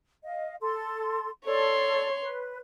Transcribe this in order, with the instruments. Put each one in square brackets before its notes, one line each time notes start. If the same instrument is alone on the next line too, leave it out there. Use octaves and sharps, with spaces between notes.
[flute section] D#5 F5
A4 C6
[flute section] A4 D5 [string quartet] C#5 C6
[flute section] B4